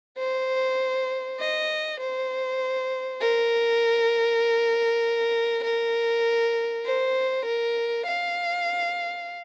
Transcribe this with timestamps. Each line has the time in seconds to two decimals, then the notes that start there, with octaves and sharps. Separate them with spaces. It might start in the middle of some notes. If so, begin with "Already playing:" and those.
0.18 C5
1.40 D#5
2.00 C5
3.21 A#4
5.63 A#4
6.85 C5
7.46 A#4
8.06 F5